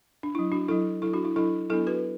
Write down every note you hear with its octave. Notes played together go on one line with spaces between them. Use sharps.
D4
F#3 D4 E4
D4 F#4
F#3 D4 E4 A4
F#3 D4 E4 A4
D4 F#4
E4
F#3 D4 E4 A4
F#3 B3 D4 E4 A4
F#4 B4